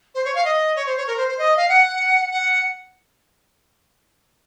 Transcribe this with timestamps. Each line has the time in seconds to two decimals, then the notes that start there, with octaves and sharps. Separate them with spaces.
0.14 C5
0.25 C#5
0.35 F5
0.45 D#5
0.76 C#5
0.86 C5
0.97 C#5
1.07 A#4
1.17 C5
1.28 C5
1.38 D#5
1.57 F5
1.68 F#5
2.31 F#5